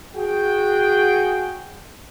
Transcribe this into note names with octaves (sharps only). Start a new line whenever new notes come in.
F#4 G#4 G5